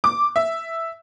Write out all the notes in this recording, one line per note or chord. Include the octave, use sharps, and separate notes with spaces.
D6
E5